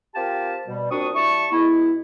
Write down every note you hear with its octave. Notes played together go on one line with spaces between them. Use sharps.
C4 F4 G4 A#4 G5 A5
B2 G3
A#2 C4 D4 F#4 C#6 D#6
G3 E4 A5 C#6
B2 G#3 B3 E4